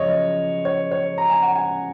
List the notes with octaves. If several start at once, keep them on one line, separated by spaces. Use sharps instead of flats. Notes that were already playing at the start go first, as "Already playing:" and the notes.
Already playing: F#2 C#3 F3 C#5 D#5
C#5
C#5
A#5
G#5
F#5
G#5